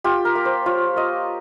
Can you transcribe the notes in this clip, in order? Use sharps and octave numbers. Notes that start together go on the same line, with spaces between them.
F4 G4
A#4
A#3
C5
F4 C#5
A#3 D#5